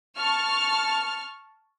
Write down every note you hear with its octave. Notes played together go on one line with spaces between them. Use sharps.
A5 C#6 F6